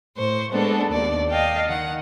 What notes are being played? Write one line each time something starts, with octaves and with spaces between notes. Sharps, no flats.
A2 C5 C#6
G#3 A#3 B3 D4 A4
D#2 D5
D#5 F5 G5 A5
D#3 F#5